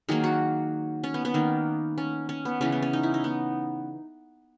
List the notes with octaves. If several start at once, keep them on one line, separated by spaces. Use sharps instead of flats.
D#3 F#3 A#3 G#4
F#4
C#4
B3
B3
D#3 A#3
C#4
C#4
B3
C#3 E3 B3 C#4
B3
C#4
D#4
E4
D#4
B3